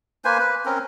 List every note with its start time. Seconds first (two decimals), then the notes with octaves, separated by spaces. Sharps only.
0.25 A#3 B4 C5 G#5
0.39 B4
0.65 C4 C#4 A#4